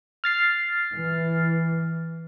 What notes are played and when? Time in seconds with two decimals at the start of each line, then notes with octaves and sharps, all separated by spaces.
0.24 F6 A6 C7
0.94 E3